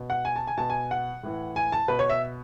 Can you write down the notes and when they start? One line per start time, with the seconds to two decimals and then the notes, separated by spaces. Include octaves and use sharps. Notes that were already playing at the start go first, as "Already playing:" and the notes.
Already playing: B2
0.10 F#5
0.25 G#5
0.36 A5
0.47 G#5
0.57 B2 A5
0.70 G#5
0.91 F#5
1.23 A2 E3
1.56 G#5
1.72 A5
1.88 B2 B4
1.99 C#5
2.10 E5